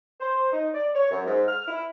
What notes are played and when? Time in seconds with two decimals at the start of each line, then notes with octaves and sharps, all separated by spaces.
0.20 C5
0.52 D#4
0.74 D5
0.95 C#5
1.11 F#2
1.26 G#2
1.48 F6
1.68 E4